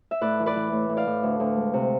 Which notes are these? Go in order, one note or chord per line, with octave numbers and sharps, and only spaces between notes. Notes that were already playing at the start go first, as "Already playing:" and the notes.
E5
A2 B4 D5
E3
B4 D5
E3
A2
A2
D5 F5
A2
D2
D2
G#3
C3